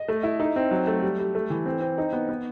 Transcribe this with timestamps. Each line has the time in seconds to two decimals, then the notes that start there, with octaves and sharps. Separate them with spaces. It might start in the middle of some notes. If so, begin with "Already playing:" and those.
Already playing: D#5
0.08 A3
0.23 E4
0.40 D#4
0.56 C4
0.71 F#3
0.87 A3
1.02 G3
1.19 G3
1.35 A3
1.50 E3
1.66 C4
1.81 C4
1.98 D#4
2.13 B3
2.29 B3